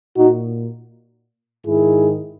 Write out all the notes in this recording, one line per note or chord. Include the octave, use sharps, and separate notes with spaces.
A#2 D#4 F#4
G#2 D#3 E4 G#4